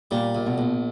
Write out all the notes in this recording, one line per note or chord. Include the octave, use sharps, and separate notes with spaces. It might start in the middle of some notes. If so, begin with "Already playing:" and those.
A#2 G3
A#1
B2
A#1